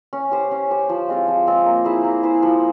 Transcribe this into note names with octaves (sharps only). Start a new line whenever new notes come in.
C#4
G4 C5
C#4
G4 C5
F3
G#3 C4 F4
F3
G#3 C4 F4
A#3
E4 G#4 C5
A#3
E4 G#4 C5
F3